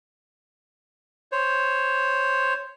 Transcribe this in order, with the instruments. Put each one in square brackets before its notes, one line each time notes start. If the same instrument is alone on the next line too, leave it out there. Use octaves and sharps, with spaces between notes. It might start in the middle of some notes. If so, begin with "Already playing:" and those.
[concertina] C5 C#5